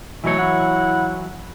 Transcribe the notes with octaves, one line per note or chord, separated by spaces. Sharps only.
B2 E3 F#3 A3 C#5
E4 F#5